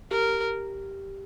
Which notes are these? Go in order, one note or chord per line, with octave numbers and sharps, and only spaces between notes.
G4 A#4